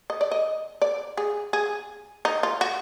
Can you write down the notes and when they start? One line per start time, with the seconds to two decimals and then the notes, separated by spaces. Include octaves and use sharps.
0.10 D#5
0.21 D5
0.31 D#5
0.82 D5
1.17 G#4
1.53 G#4
2.25 D#4
2.43 F4
2.61 F#4